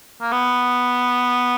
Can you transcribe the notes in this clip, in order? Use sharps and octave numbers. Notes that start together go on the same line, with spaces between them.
A#3
B3